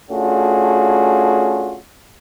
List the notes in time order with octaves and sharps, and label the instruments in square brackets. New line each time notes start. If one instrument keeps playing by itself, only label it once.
[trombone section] A3 C#4 D4 F4 F#4 G#4